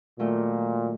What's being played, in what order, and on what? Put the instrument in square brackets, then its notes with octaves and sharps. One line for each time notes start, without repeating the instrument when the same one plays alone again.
[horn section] A#2 [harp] D#3 F#3 A3